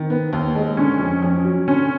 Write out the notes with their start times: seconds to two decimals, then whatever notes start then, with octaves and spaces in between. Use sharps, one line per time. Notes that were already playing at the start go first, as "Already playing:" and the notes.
Already playing: D#3 C4
0.10 B3
0.33 D#2
0.55 G#3
0.77 D3 C#4
0.99 F2
1.22 F2 C#4
1.44 F#3
1.67 D3 C#4